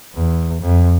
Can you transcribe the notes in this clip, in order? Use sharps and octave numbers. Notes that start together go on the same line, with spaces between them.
E2
F2